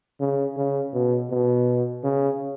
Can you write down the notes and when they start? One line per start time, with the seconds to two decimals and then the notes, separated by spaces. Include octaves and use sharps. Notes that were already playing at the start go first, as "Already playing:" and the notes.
0.20 C#3
0.57 C#3
0.93 B2
1.31 B2
2.04 C#3